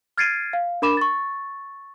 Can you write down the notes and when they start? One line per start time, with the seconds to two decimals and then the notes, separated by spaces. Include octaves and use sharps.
0.17 F6 G#6 A6 C7 D7 D#7
0.53 F5
0.82 D4 A#4 B5 D6 E7
0.97 C#6 A6